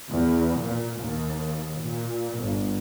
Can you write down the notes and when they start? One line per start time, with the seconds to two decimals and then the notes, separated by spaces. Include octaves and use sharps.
0.11 E2
0.61 A#2
1.01 D#2
1.82 A#2
2.41 G1